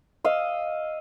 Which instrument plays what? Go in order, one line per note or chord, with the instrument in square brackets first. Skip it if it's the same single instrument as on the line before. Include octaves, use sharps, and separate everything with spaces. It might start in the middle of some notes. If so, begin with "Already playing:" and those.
[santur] D#5 F5 D#6 E6